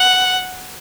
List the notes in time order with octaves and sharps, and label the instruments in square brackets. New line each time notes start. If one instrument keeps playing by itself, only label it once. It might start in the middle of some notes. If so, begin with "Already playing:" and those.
Already playing: [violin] F#5